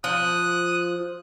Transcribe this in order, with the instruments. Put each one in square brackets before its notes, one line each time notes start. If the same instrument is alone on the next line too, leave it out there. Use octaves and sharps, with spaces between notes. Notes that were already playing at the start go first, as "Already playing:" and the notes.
[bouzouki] F3 [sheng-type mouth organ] D#6 F#6